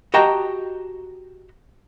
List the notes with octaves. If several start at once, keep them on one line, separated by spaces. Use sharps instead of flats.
F#4 G4 D#5 G5 A5 A#5